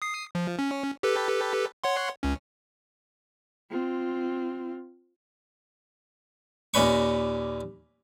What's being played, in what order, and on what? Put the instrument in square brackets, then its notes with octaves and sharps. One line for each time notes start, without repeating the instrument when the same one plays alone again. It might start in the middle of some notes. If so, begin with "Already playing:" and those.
[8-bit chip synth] D#6 C7
F3
C#4
G4 A4 B4
C#5 F#5 C6
C#2 C#4
[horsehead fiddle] C4 F4
[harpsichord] D#2 A#2 C#4 B4 C#6